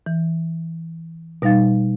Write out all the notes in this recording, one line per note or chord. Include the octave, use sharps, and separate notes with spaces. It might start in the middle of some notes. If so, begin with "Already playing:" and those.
E3
B2 G3 D#4 F5 A6